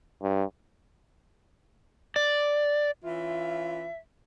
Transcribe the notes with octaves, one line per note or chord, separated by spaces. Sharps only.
G2
D5
E3 C#4 F4 E5